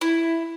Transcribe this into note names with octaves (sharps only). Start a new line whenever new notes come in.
E4